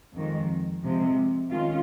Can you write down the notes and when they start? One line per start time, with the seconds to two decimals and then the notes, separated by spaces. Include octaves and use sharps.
0.14 F2 D#3 G#3
0.82 C3 F3 G#3
1.50 D#3 G#3 C#4 F4